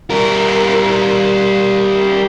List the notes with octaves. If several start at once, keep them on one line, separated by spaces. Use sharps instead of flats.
G3 A#4